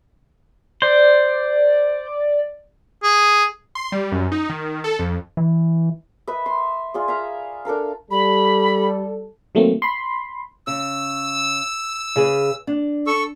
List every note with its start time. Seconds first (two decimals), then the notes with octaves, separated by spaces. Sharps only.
0.82 C5 D5
3.03 G#4
3.75 C6
3.92 G3
4.12 F#2
4.32 D#4
4.49 D#3
4.84 A4
4.99 F2
5.37 E3
6.27 B4 D#5 E5
6.46 C6
6.94 F4 G#4 D5
7.08 E5 F5 A#5
7.65 D4 A4 A#4 F5
8.11 G3 A4 B5
9.55 D#3 F#3 A3 A#3 C4
9.82 B5 C6
10.67 C#3 E6
12.16 C#3 G#4 B4
12.67 D4
13.07 A4 C#6 E6